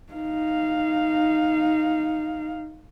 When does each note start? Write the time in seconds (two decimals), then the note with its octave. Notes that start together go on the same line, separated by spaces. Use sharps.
0.13 D#4 F5